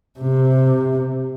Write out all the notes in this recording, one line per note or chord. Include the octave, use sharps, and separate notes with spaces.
C3